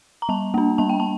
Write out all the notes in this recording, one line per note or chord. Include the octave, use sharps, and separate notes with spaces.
A#5
G3 A5
A#3 D4
G3 A5
G5
A5